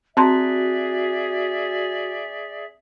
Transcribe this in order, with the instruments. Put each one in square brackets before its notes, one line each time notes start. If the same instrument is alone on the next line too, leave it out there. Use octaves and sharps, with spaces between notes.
[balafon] C4 A5 C6 [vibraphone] F#4 [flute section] G#4 D5 E5